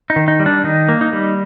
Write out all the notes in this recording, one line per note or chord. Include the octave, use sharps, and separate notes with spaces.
D#4
D#3
D#4
G3
D4
D#3 D#4
A#3
D#4
G3